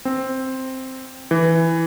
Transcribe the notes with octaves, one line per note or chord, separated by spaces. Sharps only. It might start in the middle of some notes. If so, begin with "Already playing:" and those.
C4
E3